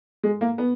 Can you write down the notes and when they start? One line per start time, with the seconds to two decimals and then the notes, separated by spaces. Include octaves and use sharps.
0.23 G#3
0.41 A#3
0.58 B3